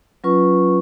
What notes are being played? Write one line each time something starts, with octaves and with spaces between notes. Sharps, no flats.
F#3 C#4 F4 B4 C#6